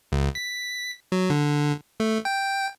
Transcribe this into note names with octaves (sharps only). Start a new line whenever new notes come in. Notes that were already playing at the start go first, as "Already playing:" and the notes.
C#2
B6
F#3
D3
A3
G5